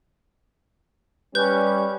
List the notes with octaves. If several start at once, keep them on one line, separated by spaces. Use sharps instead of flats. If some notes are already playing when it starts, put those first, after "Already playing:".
G3 C#4 B4 G6